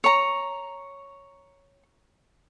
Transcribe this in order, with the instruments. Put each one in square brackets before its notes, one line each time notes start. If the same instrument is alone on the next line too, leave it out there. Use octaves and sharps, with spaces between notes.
[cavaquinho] C#5 A#5